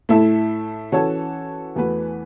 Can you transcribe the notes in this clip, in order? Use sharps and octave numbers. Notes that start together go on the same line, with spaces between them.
A2 A3 E4 A4 E5
E3 C#4 F#4 A4 C#5
E2 E3 A3 F#4 B4